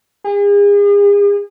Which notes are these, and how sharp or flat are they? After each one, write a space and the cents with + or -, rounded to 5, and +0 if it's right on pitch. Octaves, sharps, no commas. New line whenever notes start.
G#4 -40